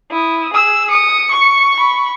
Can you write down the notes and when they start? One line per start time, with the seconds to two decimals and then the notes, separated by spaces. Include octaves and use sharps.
0.11 E4 D#6
0.54 G#4 E6
0.91 D#6 C#7
1.31 C#6
1.80 B5